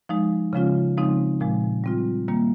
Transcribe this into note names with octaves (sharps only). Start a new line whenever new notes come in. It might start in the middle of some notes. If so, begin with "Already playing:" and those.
F3 G#3 D#4
C#3 F3 G#3 C#4 F4
C#3 F3 G#3 C4 D#4
A#2 F3 G#3
G3 C4 F4
D#3 G3 A#3